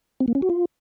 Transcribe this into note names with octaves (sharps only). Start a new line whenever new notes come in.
C4
A#3
C#4
F#4
F4